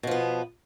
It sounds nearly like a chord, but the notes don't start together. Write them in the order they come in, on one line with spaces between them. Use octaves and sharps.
B2 F3 B3